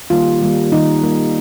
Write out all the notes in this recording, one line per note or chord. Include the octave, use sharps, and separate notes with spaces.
D#3 G3 A#3 F4
D#3 G3 A#3
D#3 G3 A#3 D#4
D#3 G3 A#3